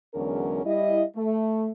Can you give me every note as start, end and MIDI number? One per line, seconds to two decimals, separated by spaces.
0.14 0.62 40
0.14 0.62 50
0.14 0.62 54
0.14 0.62 56
0.14 0.62 61
0.14 0.62 70
0.65 1.03 55
0.65 1.03 64
0.65 1.03 75
1.16 1.71 57